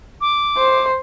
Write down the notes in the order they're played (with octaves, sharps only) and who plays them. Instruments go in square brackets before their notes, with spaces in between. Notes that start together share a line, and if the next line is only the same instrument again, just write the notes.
[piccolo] D6
[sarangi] C5